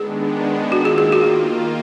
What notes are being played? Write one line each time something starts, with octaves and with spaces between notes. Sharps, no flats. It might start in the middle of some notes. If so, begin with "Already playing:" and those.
Already playing: D#3 G#3 B3 D4 G#4
D#3 A#3 F4 F#4
G#4
G#4
F#4